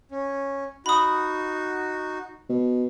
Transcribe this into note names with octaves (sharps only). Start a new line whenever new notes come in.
C#4
D#4 F#4 B5 D#6
B2